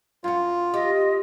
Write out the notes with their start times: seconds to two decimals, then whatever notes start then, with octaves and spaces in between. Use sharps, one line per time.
0.24 F#2 F4 F#4
0.74 G4 D#5